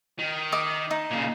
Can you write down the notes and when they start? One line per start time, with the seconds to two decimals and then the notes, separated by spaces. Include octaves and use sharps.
0.19 D#3
0.52 D#5 D6
0.91 D#4
1.11 A#2 C#3